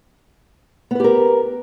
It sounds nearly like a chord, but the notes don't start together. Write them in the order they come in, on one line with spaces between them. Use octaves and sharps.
B3 B4 G4 A#4